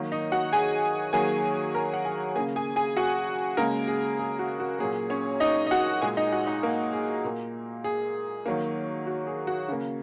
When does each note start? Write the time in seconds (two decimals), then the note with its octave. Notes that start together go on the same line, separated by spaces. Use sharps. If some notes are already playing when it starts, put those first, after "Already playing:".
Already playing: D#3 F#3 A#3
0.12 D#4 D#5
0.32 F#4 F#5
0.53 G#4 G#5
1.13 D#3 F#3 A#3 G#4 G#5
1.74 A#4 A#5
1.94 F#5
2.05 G#4 G#5
2.35 C#3 A#3 G#4 G#5
2.56 G#4 G#5
2.76 G#4 G#5
2.97 F#4 F#5
3.57 C#3 G#3 A#3 A#4
3.88 G#4
4.19 G#4
4.39 F#4
4.60 F#4
4.79 A#2 F#3 A#3 G#4
5.10 C#4 C#5
5.40 D#4 D#5
5.67 D#5
5.71 F#4 F#5
6.02 A#2 G#3 G#4 G#5
6.17 D#4 D#5
6.32 F#4 F#5
6.47 D#4 D#5
6.63 A#3 A#4
6.93 G#4
7.24 A#2 A#3
7.84 G#4
8.46 D#3 F#3 A#3
9.07 F#4
9.27 G#4
9.47 F#4
9.68 C#3 A#3